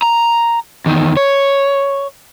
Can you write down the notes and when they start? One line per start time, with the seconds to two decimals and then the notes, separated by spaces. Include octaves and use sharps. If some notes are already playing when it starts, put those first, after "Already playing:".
0.02 A#5
0.86 E2 D#3
1.17 C#5